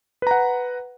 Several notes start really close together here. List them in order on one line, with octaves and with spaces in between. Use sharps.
B4 A#5 F#5